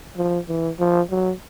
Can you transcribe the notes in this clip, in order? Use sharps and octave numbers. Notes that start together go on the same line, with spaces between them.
F3
E3
F3
F#3